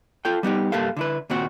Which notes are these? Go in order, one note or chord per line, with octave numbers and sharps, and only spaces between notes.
F4 A4 G5
G3 B3 D#4 G4
G2 A#3 G4 A4 F5
D3 E4 B4
D#2 A#2 C4 F#4